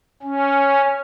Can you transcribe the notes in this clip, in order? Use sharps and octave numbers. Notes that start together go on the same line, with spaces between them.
C#4